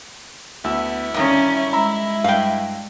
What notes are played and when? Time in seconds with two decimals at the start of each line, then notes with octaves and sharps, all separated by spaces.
0.64 D2 B3 E4 E6
1.14 G2 D3 D#3 C#4
1.73 G#3 A#5 B5 E6
2.24 G2 F5 G5